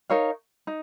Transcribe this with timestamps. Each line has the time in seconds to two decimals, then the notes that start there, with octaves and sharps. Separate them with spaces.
0.10 D#4 A#4 C#5 F5
0.67 D#4